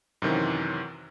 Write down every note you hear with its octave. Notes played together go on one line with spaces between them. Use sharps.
F#2 C3 D#3 E3 F#3